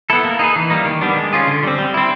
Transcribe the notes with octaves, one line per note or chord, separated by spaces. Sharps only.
B3 E4 A4
A#3
D#4 G#4 B4
E3
G3 A#3 D#4
D#3
G3 B3 D4
G#3
C#4 F4 G#4
D3
G3 C4
G3
C4 E4